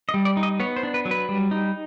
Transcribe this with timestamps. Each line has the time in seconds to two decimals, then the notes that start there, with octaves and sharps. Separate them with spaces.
0.09 D#5
0.14 G3
0.25 D5
0.37 D#4
0.43 D#5
0.60 B3 C#5
0.76 C5
0.83 D4
0.94 B4
1.05 F#3
1.11 B4
1.29 G3
1.51 D#4